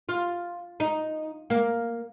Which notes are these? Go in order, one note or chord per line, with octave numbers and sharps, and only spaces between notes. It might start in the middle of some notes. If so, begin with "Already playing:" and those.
F4
D#4
A#3